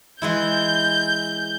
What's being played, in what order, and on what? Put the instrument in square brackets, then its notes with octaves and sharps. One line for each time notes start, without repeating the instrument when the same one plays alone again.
[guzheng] E3 G#3 E4 [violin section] G6